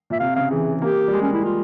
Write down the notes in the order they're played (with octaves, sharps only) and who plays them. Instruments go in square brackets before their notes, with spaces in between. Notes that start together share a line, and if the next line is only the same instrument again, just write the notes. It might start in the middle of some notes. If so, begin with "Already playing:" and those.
[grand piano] A#2 [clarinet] E5
[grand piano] C3 [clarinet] F5
[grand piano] C#3 [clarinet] F5
[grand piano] E3 [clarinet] G#4
[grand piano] A#3 [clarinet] G4
[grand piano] G3
G#3
[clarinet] C#4
E4
F4